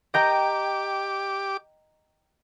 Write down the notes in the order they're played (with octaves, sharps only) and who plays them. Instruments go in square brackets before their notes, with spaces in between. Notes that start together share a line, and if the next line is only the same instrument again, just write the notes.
[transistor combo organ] G4 D6 [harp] D#5 G5 A#5